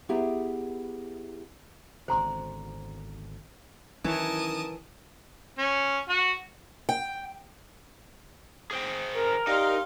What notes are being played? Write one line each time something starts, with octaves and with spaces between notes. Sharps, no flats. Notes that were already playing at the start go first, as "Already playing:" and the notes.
B3 E4 G4 G#4 E5 A#5
G#1 B2 D3 C5 A#5 C6
D#3 E3 F#3 C#4 A#4 C#5 A5 D#6
C#4
F#4 F#5
G5
G#4 C5 G5
A#4
D#4 G4 D5 F5 G5 C6